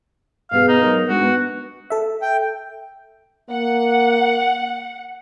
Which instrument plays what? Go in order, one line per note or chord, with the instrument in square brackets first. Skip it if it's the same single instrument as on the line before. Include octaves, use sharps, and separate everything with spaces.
[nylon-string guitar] B2 B3 G#4 [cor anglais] F5
[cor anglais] D#4
[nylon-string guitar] F#3 A#4 C#5
[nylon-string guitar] G#3 D4 D#4 [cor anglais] F#4
[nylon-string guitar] B3
[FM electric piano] A4 E5
[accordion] G5
[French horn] A#3 [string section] F#5